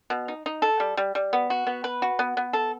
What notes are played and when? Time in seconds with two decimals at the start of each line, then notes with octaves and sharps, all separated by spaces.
0.10 B2
0.28 D#4
0.46 D#4
0.62 A4
0.80 G3
0.97 G3
1.15 G3
1.33 B3
1.50 F#4
1.67 B3
1.84 B4
2.02 F#4
2.19 B3
2.37 B3
2.53 A4